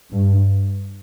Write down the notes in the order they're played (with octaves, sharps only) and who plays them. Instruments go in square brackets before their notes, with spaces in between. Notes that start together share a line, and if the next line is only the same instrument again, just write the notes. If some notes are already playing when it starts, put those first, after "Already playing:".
[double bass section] G2